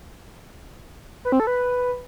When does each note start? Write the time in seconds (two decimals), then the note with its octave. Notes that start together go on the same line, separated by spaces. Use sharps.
1.25 B4
1.32 C4
1.40 A4
1.47 B4